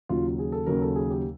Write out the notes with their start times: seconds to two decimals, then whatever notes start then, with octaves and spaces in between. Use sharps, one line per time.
0.09 D#2 C#3 F#3 F4
0.39 G#4
0.52 A4
0.67 D#2 C#3 F#3 A#4
0.82 A4
0.96 G#4
1.10 G4